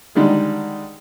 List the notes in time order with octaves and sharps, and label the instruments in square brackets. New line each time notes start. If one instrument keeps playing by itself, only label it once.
[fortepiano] D3 D#3 G3 G#3 D#4